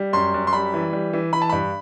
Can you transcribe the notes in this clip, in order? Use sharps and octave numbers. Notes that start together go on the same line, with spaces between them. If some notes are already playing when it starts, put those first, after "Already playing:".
Already playing: G3
F#2 C6
F#2
C6
G3 B5
E3
G3
E3
E3 B5
A5
G2 B5